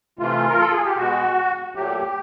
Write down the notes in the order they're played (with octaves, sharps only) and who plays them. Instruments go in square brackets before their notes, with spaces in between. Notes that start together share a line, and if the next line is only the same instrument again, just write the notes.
[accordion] C3 E3 A3 F4
A#4
A4
G#4
G4
B2 G#3 F#4
A#2 F#3 A3 G4